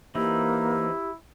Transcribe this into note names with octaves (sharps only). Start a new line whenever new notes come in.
E3 A#3 C4 D#4 E4 G4